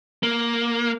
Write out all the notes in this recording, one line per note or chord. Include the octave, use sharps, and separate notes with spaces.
A#3